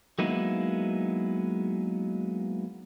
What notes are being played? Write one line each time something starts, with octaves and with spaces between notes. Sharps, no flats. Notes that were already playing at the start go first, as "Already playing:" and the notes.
F#3 G#3 A#3 B3 D#4 E4